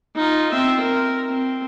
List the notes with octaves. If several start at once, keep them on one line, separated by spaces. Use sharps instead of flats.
D#4 F4
C4 E5
A#4
C4